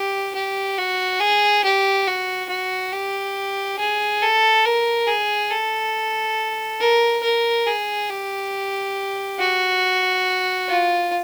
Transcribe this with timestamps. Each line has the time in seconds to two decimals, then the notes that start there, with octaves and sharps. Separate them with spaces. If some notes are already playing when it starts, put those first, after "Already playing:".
Already playing: G4
0.34 G4
0.78 F#4
1.20 G#4
1.64 G4
2.07 F#4
2.49 F#4
2.92 G4
3.79 G#4
4.22 A4
4.65 A#4
5.07 G#4
5.51 A4
6.80 A#4
7.23 A#4
7.66 G#4
8.09 G4
9.39 F#4
10.68 F4